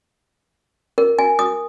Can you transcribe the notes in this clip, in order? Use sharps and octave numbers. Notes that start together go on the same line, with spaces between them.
A#4
G#5
D#6